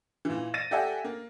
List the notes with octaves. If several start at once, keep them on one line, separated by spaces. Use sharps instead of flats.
A#2 E3
A6 A#6 D#7
G4 A4 D5 E5 F#5 G#5
A#3